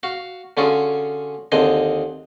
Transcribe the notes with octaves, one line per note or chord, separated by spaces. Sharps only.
F#4 F5
D3 C#4 F4 F#4 G#4
D#2 D3 C4 G#4 D#5